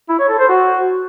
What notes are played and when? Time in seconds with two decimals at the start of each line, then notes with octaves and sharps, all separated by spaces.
0.09 E4
0.19 C#5
0.29 A4
0.39 C5
0.49 F#4